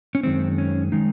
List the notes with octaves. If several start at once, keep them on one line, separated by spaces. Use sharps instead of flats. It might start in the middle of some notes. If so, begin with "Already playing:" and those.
C#4
F#2 D#3 G#3 C4
C#4
D#3 G#3 D#4